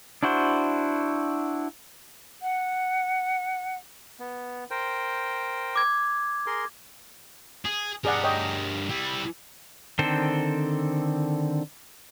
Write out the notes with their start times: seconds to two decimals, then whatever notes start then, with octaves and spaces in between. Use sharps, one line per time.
0.23 D4 E4 F#4 C5
2.42 F#5
4.20 B3
4.71 A#4 C5 G5
5.76 D6 G#6
6.47 G#4 A#4 C6
7.65 G#4
8.05 G2 G#4 A#4 D5 F#5
8.24 C#5 D#5 G5
8.89 G3 E4
9.99 D3 D#3 C4 A4 C5